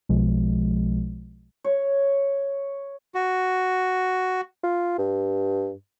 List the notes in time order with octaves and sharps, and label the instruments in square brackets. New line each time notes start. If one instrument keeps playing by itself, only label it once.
[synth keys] B1 B2 F3 G#3
[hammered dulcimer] C#5
[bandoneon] F#4
[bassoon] F4
G2